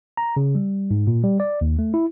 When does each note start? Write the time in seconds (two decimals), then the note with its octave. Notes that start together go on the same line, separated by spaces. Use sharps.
0.17 A#5
0.37 C#3
0.55 G3
0.91 G#2
1.07 A#2
1.24 G3
1.40 D5
1.61 D#2
1.79 A3
1.94 E4